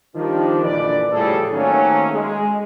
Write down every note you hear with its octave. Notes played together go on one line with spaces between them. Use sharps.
D#3 F3 G3 D4
A#1 F#2 D3 E3 B4 D5
A2 C#3 F3 G3 G#4 A4
D#3 F#3 A3 A#3 C4 C#4
G#3